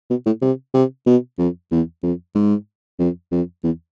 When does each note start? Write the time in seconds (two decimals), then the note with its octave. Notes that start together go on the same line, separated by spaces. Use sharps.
0.10 B2
0.26 A2
0.42 C3
0.74 C3
1.07 B2
1.38 F2
1.71 E2
2.03 F2
2.35 G#2
2.99 F2
3.32 F2
3.64 E2